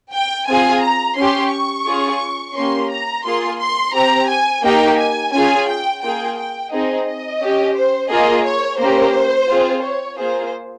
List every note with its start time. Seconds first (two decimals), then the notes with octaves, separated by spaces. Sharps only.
0.13 G5
0.48 C4 F4 G#4 G#5
0.82 A#5
1.17 C#4 G4 C6
1.53 C#6
1.87 C#4 F4 G#4
2.56 A#3 C#4 G4 C6
2.90 A#5
3.25 A#3 F4 G#4 C6
3.60 C6
3.94 C4 G4 A#5
4.29 G#5
4.64 A#3 D#4 G4 G5
4.99 G#5
5.33 C#4 F4 G#4 G#5
5.68 G5
6.03 A#3 F4 G#4 G5
6.38 G5
6.72 C4 D#4 G#4 D#5
7.07 D#5
7.41 C#4 G4
7.76 C5
8.10 A#3 F4 G#4 D#5
8.46 C#5
8.80 A#3 C#4 G4 C5
9.50 C4 F4 G#4
9.84 C#5
10.18 A#3 F4 G#4 C5